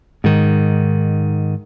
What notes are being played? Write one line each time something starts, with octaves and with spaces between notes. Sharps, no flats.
G#2 D#3